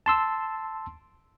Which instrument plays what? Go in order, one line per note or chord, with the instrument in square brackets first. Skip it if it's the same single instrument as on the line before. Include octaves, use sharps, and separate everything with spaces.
[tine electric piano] A5 C6 E6